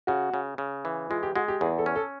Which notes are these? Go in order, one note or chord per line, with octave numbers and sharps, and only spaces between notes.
C#3 F#4
C#3
C#3
E3
G#3 F4
G4
G#3 F#4
G4
E2 G#4
A4
C#4
A4